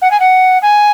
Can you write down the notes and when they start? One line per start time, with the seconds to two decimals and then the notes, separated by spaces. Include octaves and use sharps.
0.01 F#5
0.11 G#5
0.20 F#5
0.62 G#5